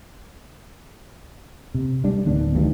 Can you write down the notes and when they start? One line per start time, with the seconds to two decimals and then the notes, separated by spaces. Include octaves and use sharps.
1.75 C3
2.04 G3 D4
2.25 D1 D#3 B3 D4
2.55 D2 G2 D#3